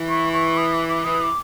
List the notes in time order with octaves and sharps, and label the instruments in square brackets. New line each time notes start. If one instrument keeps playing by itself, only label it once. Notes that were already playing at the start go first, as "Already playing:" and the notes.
Already playing: [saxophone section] E3
[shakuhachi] C#6
C#6
D#6
D6
D6
[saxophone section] E3 [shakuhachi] D#6
[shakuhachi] D6